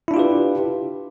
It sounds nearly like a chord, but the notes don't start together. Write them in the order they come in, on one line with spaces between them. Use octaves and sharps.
E4 D4 F4 G4 B4